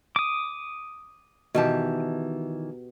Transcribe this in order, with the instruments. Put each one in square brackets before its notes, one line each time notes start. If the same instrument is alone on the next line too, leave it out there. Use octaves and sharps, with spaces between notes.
[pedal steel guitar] D6 D#6
[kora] B2 G4 [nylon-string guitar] D#3 E3 A5